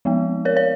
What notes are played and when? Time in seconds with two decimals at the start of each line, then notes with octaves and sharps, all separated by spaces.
0.05 F3 G#3 B3
0.45 A#4 C#5
0.57 C#5